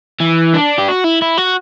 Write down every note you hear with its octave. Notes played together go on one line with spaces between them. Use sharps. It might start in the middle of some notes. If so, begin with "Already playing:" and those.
E3
D4
G4
F#4
E4
E4
F#4